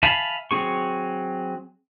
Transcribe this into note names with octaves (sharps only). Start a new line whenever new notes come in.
E5 F5 G#5 A5 B5
F#3 C4 G#4 C#6